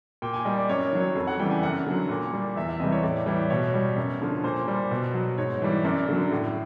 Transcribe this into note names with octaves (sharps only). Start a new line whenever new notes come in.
A#2 G5
G#5
G3 D#5
D5
F#2 C#5
D#3 F#3
C#5
F2
F#5
C#3 E3 G3 G5
G#5
F#2 F#5
D3 F#3
A#2
G3
E2 E5
E5
C3 E3 G3 D#5
C#5
A2 D5
E3 G3 C#5
B2 C#5
G3
F#2
D3 F3
A#2 C5
G3
B2
F#3
G#2 C#5
E3 G3
F#2 D5
D3 F#3
A2